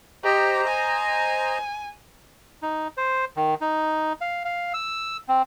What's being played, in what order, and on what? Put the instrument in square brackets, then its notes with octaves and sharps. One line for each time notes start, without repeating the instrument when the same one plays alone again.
[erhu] G4 [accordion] C5 D#5 A#5
[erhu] G#5
[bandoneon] D#4
C5
D#3
D#4
F5
F5
E6
C4